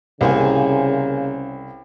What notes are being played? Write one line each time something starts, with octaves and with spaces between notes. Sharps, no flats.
C2 C#3 A#3 C5 G#5